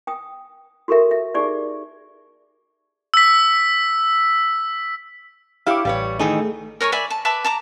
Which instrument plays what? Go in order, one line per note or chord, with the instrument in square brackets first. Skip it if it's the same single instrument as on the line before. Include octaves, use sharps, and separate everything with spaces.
[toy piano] G5 D#6
F#4 G4 A4 A#4 E5
E5
D#4 G4 G#4 D5
[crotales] E6 B6
[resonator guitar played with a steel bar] E4 G4 C#5 [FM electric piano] F5 D6
[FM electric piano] A1 [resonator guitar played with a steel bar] G3 B4 C#5
[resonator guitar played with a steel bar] D#3 E3 D#4 [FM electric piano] A3 G#4
[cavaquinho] A#4 C#5 G#5 C#6
D5 E5 G#5 B5
A5
B4 E5 A5 D6
A5 A#5 D6